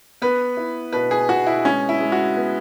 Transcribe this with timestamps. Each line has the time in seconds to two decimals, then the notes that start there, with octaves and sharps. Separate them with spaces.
0.22 B3 B4
0.57 E4
0.93 B2 B4
1.11 G#4
1.29 B2 F#4
1.46 E4
1.64 G#3 C#4
1.89 E4
2.01 G#3
2.12 F#4
2.37 B3